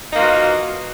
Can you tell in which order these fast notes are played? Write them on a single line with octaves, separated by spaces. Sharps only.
D#4 A#3 F4 F#4 B3